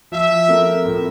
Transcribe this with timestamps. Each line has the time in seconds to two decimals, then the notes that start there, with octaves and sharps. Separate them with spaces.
0.12 F3 E5
0.48 A3 C4 F4 A#4
0.85 A2